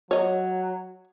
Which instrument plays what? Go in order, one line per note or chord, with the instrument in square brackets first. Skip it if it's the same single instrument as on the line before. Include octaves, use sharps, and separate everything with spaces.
[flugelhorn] F#3 [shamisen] C#5 D#5